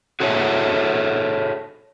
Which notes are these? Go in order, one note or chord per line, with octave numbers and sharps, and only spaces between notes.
F#4 G#4 A4 C#5 E5